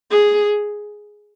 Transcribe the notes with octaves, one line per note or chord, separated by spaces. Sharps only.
G#4